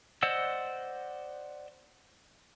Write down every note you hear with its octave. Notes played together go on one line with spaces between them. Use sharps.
C5 D5 D#5 F#5 E6